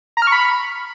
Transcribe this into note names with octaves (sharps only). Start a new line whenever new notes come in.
A#5
F6
C#6
B5